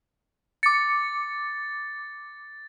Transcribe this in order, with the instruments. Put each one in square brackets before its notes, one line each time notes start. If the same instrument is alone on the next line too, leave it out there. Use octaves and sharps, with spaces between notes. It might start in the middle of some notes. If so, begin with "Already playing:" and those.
[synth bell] D6 C#7 [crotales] A6